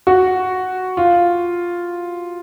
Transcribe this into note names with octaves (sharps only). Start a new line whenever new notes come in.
F#4
F4